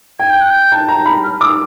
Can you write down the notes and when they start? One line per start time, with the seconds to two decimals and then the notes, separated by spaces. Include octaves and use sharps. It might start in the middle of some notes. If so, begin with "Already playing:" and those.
0.19 G5 G#6
0.30 G6
0.41 F#6
0.50 G6
0.72 A5
0.89 A#5
1.06 B5
1.24 F6
1.41 D6 E6